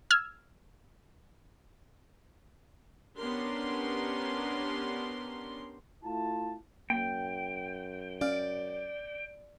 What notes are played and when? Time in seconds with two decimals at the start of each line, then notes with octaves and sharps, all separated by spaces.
0.11 E6 F6 G#6
3.18 B3 C#4 D4 G4 A#4 C6
6.04 A3 E4 F4 A5
6.90 F#2 A#3 G5
8.21 C#4 D5 F5 F6